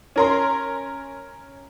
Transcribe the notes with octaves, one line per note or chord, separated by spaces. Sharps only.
C#4 A#4 C6